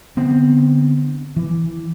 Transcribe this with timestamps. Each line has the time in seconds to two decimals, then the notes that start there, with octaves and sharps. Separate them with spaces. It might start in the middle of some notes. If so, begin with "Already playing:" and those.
0.17 D3 B3 C4
1.36 E3